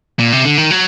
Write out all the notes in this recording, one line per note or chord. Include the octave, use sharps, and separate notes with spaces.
A#2
C3
D3
D#3
F#3